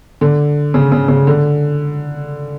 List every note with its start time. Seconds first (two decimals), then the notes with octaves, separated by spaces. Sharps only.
0.21 D3
0.74 C#3
0.92 C#3
1.08 C#3
1.27 D3